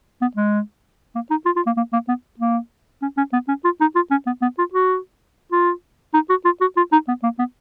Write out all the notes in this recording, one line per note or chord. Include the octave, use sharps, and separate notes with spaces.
B3
G#3
A#3
D#4
F4
F4
A#3
A#3
A#3
B3
A#3
C#4
C#4
B3
C#4
F4
D#4
F4
C#4
B3
B3
F4
F#4
F4
D#4
F#4
F4
F#4
F4
D#4
B3
A#3
B3